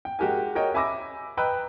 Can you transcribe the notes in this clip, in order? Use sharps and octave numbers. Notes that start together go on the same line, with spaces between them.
G5
G#3 F#4 G4 A#4 G#5
F#4 A#4 C#5 D#5 G5
E5 G#5 B5 D6 E6 A#6
B4 D#5 G5 A#5 E6 F#6